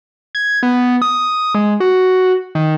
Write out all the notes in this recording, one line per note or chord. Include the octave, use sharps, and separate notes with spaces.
G#6
B3
D#6
G#3
F#4
D#3